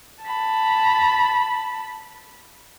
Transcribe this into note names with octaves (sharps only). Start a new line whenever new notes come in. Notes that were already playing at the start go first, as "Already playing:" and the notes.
A5 B5